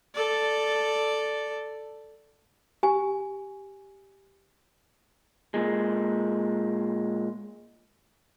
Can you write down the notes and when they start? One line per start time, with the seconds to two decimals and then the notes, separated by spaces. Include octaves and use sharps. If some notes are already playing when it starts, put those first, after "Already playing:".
0.14 A4 D5
2.83 G4 G#5
5.54 A#2 G#3